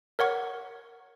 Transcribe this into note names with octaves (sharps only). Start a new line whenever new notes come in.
A#4 C#5 F#5 C#6